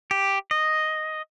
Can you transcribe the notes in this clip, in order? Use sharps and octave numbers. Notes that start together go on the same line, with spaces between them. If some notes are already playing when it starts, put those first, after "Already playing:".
G4
D#5